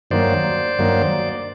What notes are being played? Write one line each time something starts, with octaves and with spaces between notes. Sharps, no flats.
G2 D#3 F#3 A#3 C5 D5
G2 D#3 F#3 A#3